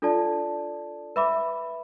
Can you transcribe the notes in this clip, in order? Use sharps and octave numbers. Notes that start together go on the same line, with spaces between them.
D4 F4 A4 D5 A5
B4 E5 B5 D6